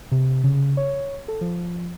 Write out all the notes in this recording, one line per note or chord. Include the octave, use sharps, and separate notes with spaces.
C3
C#3
C#5
A4
F3